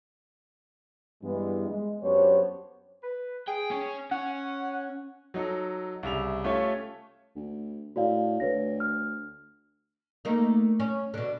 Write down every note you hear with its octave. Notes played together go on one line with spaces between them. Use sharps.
G2 E3 G#3 B3
G#3
F#2 B3 D4 G4 C5 C#5
B4
G#4 G5
C#4
C#4 F#5
F#3 D#4 A4
C2 C#3 E5 F7
A3 C#4 F4 G4 C#5 E5
D2
A2 F#4 D5 F5
D2 B4 C#5 A#6
F6
A3 A#3 D#4
C#4
B2 D3